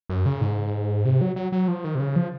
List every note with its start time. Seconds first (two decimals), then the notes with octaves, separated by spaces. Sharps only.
0.09 F#2
0.26 C#3
0.41 G#2
1.05 C3
1.21 F#3
1.36 F#3
1.52 F#3
1.68 F3
1.84 D#3
1.95 C3
2.00 C#3
2.16 F3